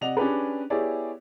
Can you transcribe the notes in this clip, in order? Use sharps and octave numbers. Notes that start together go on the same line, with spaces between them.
C3 D5 D#5 F#5 F7
C#4 D4 G4 G#4 B4
B3 E4 G4 G#4 C#5 D5